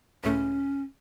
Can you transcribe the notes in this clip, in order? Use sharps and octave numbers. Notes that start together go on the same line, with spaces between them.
C#2 A2 A3 C#4